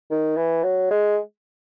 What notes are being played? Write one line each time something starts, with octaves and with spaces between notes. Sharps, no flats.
D#3
E3
F#3
G#3